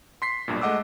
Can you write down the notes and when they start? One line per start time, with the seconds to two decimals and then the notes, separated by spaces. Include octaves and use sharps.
0.22 C6 B6 C7
0.48 B1 G2 A#2
0.61 G#3 A3 D#5 F#5 D6 E6